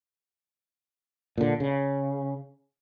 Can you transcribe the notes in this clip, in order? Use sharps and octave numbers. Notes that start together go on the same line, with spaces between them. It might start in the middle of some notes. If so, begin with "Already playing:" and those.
A#2 D3
C#3